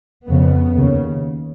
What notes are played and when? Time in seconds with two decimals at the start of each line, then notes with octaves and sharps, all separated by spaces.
0.27 F2 C#3 B3
0.76 D#2 C#3